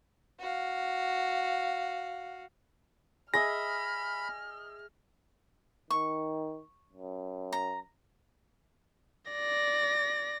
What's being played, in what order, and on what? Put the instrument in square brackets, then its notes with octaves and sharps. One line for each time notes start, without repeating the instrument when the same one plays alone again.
[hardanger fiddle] F#4 F5
[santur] G#4 D#5 E5 [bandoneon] B5 [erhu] F6 [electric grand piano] A#6
[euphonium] D#3 [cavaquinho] C#6
[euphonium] F#2
[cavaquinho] A#5
[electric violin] D5 A#6